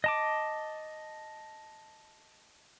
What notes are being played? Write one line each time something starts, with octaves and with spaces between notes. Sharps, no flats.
D#5 A5 D6